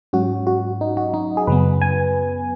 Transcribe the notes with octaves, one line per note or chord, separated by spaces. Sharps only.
G#2 F#3 C#4 F#4
F#4
D#4
F#4
D#4
G#4
F#2 C#3 F#3 B3 B4
G#5